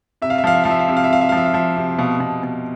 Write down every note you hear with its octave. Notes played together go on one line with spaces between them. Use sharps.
C3 E5
F5
E5
F3 F5
E5
F3 F5
E5
F5
C3 E5
F5
E5
C3 F5
E5
F3 F5
E5
F5
F3 E5
C3
B2 F5
B2
B2